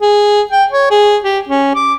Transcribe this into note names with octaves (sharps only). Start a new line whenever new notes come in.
G#4
G5
C#5
G#4
G4
C#4
D6